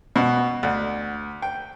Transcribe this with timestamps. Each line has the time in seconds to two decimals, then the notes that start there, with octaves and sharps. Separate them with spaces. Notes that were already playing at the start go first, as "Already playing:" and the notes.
0.16 B2
0.63 D2
1.42 G5